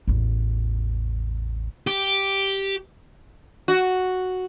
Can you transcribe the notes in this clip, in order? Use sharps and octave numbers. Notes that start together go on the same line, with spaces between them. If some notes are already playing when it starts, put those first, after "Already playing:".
A1 E2
G4
F#4